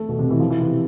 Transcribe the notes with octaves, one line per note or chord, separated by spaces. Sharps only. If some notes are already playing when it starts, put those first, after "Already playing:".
Already playing: A3
B2
C3
E3
F3
E3
C3